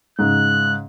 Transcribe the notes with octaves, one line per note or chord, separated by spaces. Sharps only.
G#2 C#3 F#6